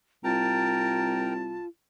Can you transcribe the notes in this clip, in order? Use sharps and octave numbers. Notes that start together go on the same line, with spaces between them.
C2 F4 A#4 G5 A5 A#5